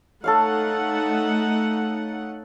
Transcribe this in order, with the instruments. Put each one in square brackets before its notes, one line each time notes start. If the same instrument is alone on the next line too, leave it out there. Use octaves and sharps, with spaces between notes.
[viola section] A3 D#4 F#5 [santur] A4 C#5 F5